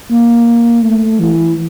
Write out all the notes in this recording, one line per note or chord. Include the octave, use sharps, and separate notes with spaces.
A#3
A3
E3